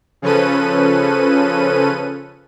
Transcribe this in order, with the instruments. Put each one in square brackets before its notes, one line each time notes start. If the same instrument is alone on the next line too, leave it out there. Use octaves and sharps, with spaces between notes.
[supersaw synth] C#3 F3 C#4 A4 B4 D#7